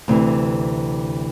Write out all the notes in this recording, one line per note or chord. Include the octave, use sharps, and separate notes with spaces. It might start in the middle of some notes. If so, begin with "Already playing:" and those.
D2 C3 E3